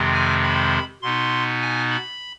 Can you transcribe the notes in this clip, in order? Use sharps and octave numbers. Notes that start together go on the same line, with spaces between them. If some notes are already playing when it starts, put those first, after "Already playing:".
Already playing: F2 C3 D#3 G#3 C4
G#5
B5
B2 B3 D#4 C6
G#5
B5